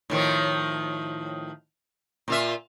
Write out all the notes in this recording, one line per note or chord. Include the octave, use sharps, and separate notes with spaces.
A2 D#3 F3
A#2 F4 E5